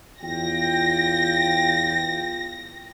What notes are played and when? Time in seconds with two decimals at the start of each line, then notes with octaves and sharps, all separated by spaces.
0.21 E2 F4 G5 A#6